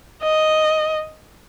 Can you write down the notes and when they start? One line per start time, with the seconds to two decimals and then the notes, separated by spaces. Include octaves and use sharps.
0.23 D#5